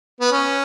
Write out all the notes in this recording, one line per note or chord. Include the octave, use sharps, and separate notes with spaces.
B3
C#4